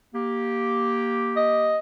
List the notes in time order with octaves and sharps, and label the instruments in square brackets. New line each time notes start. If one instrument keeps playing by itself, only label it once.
[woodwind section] A#3 G4
[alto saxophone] D#5